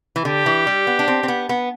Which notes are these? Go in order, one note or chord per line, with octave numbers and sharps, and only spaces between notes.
E3
D3 G4
E3
G3
B3
D4
C4
C4
B3
B3